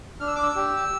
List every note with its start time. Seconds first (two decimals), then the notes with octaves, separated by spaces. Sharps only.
0.20 D4 F6
0.27 E6
0.36 D6
0.42 E6
0.56 G4